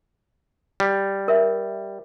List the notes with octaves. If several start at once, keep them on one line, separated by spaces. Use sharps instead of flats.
G3
A#4 E5